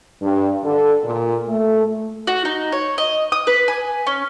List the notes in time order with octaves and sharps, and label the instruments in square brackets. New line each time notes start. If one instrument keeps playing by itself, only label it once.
[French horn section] G2
D3
A#2
A3
[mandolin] F#4
D#4
C#5
D#5
D#6
B4
G#5
C#4